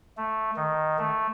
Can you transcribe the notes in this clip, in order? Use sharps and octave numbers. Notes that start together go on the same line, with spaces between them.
A3
D#3
A3